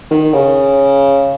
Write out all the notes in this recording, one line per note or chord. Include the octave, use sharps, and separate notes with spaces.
D#3
C#3